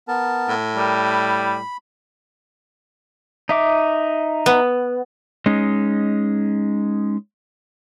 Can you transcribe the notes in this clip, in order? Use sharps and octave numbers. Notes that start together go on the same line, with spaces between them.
B3 A#4 A5
A2
G3 A#4
B5
D#4 E5 D6
B3
G#3 C#4 D#4